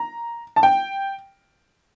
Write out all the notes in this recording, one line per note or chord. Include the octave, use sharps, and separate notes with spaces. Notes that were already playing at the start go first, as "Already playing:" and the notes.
Already playing: A#5
A5
G5